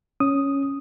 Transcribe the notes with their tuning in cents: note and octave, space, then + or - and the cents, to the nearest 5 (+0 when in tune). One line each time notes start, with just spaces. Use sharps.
C#4 +0 D#6 +0